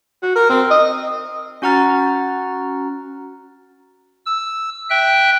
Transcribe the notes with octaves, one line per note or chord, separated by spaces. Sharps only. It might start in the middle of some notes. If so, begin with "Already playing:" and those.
F#4
A#4
C4
D#5
C#4 F#4 F#5 A#5 F6 A6
E6
E5 G5 F#6